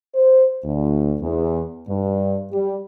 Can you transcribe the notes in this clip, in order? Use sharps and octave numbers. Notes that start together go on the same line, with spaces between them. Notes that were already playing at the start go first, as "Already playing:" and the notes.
C5
D2
E2
G2
G3